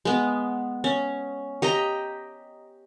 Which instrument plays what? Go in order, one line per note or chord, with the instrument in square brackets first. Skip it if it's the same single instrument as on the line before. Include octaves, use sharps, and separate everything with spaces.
[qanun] G#3 B3
C#4
G4 D#5 G5 A#5